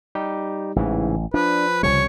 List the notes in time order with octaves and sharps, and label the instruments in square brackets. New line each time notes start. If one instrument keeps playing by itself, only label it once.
[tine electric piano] G3 D#4 G4
[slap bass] A1 [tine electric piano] G#2 C#3 E3
[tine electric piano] F3 [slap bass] D4 [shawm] B4
[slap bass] C2 C#3 G3 [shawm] C#5